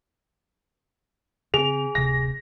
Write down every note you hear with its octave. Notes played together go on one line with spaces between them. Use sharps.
C#3 C4 G#4 F7
D1 C3 A#6